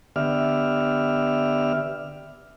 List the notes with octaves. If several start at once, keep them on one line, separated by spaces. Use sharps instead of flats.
D3 B3 G4 D5 E5 F6